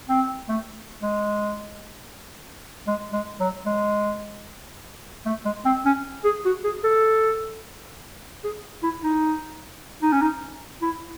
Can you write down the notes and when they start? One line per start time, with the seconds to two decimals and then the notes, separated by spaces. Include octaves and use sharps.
0.09 C4
0.49 A3
1.02 G#3
2.87 G#3
3.13 G#3
3.40 F#3
3.66 G#3
5.25 A3
5.45 G#3
5.65 C4
5.85 C#4
6.24 G#4
6.45 F#4
6.64 G#4
6.84 A4
8.44 G#4
8.83 E4
9.03 D#4
10.02 D#4
10.12 C#4
10.21 D#4
10.82 E4